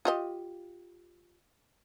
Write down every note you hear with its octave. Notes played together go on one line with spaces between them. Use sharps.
F4 G4 D#5